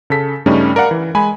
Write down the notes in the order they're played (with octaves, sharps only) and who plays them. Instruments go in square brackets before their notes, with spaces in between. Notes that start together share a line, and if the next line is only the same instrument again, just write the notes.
[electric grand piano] C#3 A4 B6
G2 C#3 G3 A3 C#4 D#4
A#4 D5 F5 F#5
E3
G#3 G#5 B5